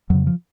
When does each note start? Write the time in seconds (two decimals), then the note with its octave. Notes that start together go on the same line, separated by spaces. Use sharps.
0.10 F2 C#3 F#3
0.27 F3